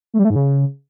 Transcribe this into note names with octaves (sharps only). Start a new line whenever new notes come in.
A3
G3
A3
G#2
C#3